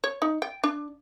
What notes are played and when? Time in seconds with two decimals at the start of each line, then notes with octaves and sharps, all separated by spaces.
0.04 C#5
0.22 D#4
0.42 G5
0.64 D4